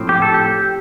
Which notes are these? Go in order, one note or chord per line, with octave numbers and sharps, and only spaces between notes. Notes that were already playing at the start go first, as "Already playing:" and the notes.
Already playing: A2 F3 C4
G4
A4
G4